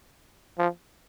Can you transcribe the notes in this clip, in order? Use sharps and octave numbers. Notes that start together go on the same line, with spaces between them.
F3